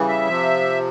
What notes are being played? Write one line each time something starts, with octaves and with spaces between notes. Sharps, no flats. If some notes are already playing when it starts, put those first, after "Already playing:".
Already playing: C#3 E3 G3
E5
C3 F3